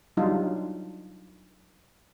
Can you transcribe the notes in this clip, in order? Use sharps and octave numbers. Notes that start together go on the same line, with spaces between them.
F#3 G3 D4 D#4 F4